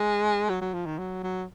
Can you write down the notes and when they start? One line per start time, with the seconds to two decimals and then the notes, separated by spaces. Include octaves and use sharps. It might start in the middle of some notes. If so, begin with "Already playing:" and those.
Already playing: G#3
0.49 F#3
0.61 F#3
0.74 F3
0.86 D#3
0.99 F#3
1.23 F#3